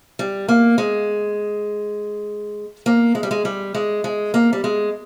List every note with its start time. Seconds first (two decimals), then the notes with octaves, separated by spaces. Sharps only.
0.19 G3
0.49 A#3
0.78 G#3
2.86 A#3
3.15 G#3
3.23 G3
3.31 G#3
3.45 G3
3.75 G#3
4.04 G#3
4.34 A#3
4.53 G3
4.64 G#3